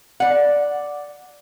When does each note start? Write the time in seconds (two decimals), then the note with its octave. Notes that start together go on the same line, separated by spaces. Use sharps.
0.20 D5 F#5